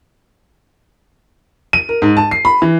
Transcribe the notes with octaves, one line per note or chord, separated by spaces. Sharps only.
D#7
A#4
G#2
A5
C7
B5
E3